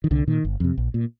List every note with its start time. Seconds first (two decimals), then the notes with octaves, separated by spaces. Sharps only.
0.04 D#3
0.11 C2 D3
0.27 A#2 D#3
0.45 G1
0.60 F2 C3
0.77 A#1
0.94 A#2